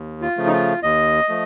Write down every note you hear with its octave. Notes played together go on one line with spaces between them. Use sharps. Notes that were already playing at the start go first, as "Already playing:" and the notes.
Already playing: D#2
F4
C#3 F3 A3
D#4
F4
D#2 D#5
F3 A3